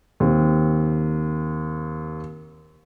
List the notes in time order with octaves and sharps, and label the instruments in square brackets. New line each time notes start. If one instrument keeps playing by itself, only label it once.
[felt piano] D#2 C4